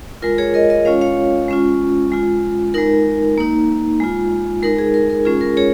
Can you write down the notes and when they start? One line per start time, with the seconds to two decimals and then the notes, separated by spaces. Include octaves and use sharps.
0.22 G#3 F4 A#4
0.38 G#4 C#5
0.54 A#4 D#5
0.70 A#4 D#5
0.85 G#3 C#4 F4 C#5 F5
1.01 C#5 F5
1.48 G#3 C#4 F4
2.12 G#3 F4
2.74 G#3 D#4 A#4
3.38 A#3 D#4
4.00 G#3 F4
4.63 G#3 D#4 A#4
4.78 G#4
4.94 A#4
5.10 A#4
5.25 G#3 C#4 F4 G#4
5.41 A#4
5.57 G#4 C#5